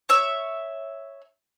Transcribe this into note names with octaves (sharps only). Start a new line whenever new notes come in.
C#5 E5 E6